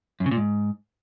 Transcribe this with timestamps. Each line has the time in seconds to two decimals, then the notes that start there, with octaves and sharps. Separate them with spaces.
0.20 F#2
0.26 C#3
0.31 A#2
0.37 G#2